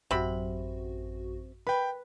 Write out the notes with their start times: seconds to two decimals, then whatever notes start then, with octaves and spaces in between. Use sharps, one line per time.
0.11 A1 F#2 C3 F#4 B5
1.67 B4 G5 B5